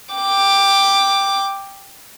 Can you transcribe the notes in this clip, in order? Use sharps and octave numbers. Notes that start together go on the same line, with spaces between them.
G5 D6